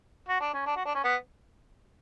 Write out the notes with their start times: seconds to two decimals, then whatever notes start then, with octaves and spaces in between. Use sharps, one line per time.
0.29 F#4
0.41 D4
0.53 C#4
0.66 D4
0.76 F#4
0.85 D4
0.95 C#4
1.04 B3